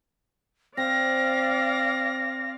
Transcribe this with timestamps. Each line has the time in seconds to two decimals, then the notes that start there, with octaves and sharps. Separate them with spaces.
0.77 C4 D5 F5 A#6